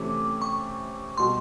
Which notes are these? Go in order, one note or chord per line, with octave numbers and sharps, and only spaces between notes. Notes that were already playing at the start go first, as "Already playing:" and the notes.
Already playing: C3 E3 A3 C#4 D6
C#6
B2 G3 C6